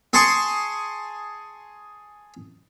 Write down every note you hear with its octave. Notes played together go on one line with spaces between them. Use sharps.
G#4 G#5 A5 C6 C#6 D#6